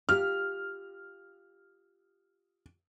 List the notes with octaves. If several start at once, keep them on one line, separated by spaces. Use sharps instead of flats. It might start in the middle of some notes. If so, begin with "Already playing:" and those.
F4 G4 F6